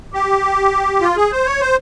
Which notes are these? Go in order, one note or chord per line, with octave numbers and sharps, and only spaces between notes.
G4
F4
G#4
C5
C#5
C5